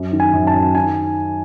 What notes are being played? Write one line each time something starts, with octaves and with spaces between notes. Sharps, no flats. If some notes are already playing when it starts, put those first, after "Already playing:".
Already playing: F#2
D#3
G#5
F#2
A5
F#2
D#3 G#5